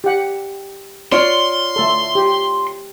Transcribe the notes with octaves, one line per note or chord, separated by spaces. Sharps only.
G4 F#5
F4 C#5 D5 C6
A3 A4
G4